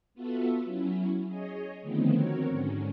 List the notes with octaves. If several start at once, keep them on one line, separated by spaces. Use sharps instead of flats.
B3 F4 F#4 A4 E5
F#3 C#4 E4
G#4 C#5 D#5
D3 D#3 F3 A3 B3 C4
C4 F#4 A#4 C#5
G#2 D3 C#4